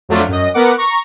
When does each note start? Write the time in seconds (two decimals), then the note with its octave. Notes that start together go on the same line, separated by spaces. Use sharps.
0.09 F2 F#3 A3 D4 F4
0.28 F#2 D#5
0.54 B3 A#4 F#5 D6
0.78 A#5 C#6